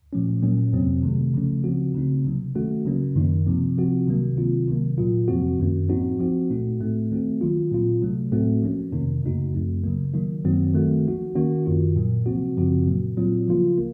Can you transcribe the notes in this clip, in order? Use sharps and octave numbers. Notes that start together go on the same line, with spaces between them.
A#2 F3 A3 C#4
A#2 F#3 A#3 C#4
F2 C3 F#3 C4
C3 D#3 A3
C#3 F3 A3 C#4
C#3 F3 C4 F#4
C#3 A3 C4 D#4
C3 F#3 A#3
D#3 A3 C#4 F#4
C#3 F#3 A#3 C#4
F#2 D#3 A#3 D#4
C3 F3 C4
C3 F3 C4 F#4
C3 D#3 F#3 A#3
C3 D#3 F#3 C4 F4
C3 D#3 F#3 A#3
A#2 F#3 A#3 F4
F2 C3 F3 C4 F#4
F#2 D#3 A#3 C#4
A2 F3 C4 D#4 F#4
F3 C4 F#4
A#2 A3 D#4 F#4
A2 A3 C4
D#3 A3 C4 F#4
D#3 F#3 A#3 F4
A#2 F#3 C4 F4
C3 F#3 A3
A2 A3 C4 F#4
F3 A#3 C#4
F2 C3 D#3 A#3 D#4
F#2 C#3 A3 D#4 F#4
F#2 F3 A3 C4
C#3 F#3 A#3
D#3 F#3 A#3 D#4
F#2 D#3 F#3 C4 F#4
D#3 A3 C4 F#4
F3 A#3 D#4 F#4
D#3 A#3 C#4 F#4
F#2 D#3 A#3 F4
A#2 F#3 A#3
C3 F3 C4 F#4
F#2 C#3 F3 C4 F#4
A#2 F#3 A#3
A#2 F#3 C4 F4
C#3 F3 A#3 F4
A#3